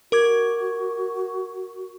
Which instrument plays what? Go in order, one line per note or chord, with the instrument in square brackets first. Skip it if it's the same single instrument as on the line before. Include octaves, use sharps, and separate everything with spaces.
[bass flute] F#4 [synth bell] A#4 D6 G#6